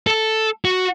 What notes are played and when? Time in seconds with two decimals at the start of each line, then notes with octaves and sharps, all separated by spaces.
0.07 A4
0.65 F#4